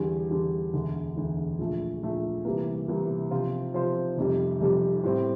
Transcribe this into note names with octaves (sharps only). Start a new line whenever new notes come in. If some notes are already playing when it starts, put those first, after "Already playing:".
Already playing: E2 D3 G3
E2 D3 G3
E1 D2 D3
E1 D2 D3
A#1 A#2 A3
A#1 A#2 A3
C2 C3 E3 G3 A#3
C2 C3 E3 G3 A#3
C3 F3 C4 F4 C5
C3 F3 C4 F4 C5
F1 F2 C3 G3
F1 F2 C3 G3
A2 G3 C4